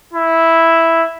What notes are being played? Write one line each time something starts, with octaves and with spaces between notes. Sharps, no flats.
E4